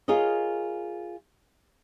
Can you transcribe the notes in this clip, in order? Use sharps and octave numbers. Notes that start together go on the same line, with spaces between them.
F4 G#4 A#4 C#5 D#5